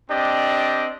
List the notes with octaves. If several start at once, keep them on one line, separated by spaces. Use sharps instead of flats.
C4 D4 G4 D5 D#5